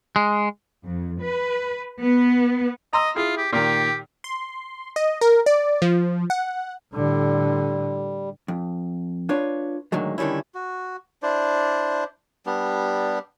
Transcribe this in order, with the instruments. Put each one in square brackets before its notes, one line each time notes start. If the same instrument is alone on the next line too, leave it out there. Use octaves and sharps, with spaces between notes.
[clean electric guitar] G#3
[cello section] F2
B4
B3
[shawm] D#5 [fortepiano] A#5 C6 E6
[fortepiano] E4 G#4 [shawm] F4
[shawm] G4
[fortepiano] A#2 D#3 [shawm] G4
[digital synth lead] C6
D#5
A#4
D5
F3
F#5
[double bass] A2 D3 [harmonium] G3
[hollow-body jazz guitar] F2
D4 F4 B4 C#5
A2 D3 D#3 F#3 G#3
D3 D#3 G3 C#4 E4
[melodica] F#4
D4 E4 C5 D5
G3 B3 D4 G4